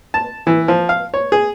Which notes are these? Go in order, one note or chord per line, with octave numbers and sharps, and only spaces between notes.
A5
E3
F3
F5
C#5
G#4